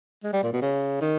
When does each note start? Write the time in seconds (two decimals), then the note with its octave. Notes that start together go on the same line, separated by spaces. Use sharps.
0.24 G#3
0.33 G3
0.43 A#2
0.53 B2
0.62 C#3
1.01 D#3